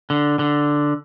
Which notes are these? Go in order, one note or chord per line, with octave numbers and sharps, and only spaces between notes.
D3
D3